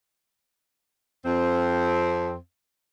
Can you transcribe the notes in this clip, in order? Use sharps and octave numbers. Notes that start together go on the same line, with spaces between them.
F2 C4